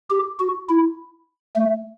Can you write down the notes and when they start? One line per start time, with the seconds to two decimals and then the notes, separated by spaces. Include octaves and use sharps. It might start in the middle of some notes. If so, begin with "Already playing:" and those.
0.10 G4
0.39 F#4
0.69 E4
1.56 A3